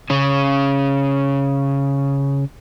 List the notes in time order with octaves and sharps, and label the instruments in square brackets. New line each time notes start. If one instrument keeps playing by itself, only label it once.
[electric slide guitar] C#3 C#4